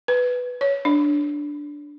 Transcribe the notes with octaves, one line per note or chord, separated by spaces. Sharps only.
B4
C#5
D4